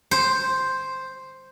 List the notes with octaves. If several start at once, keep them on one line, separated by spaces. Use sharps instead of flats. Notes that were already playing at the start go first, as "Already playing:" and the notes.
C5